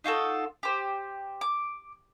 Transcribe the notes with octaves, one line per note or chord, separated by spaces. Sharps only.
D#4 F4 F#4 A4
G4 C5
D6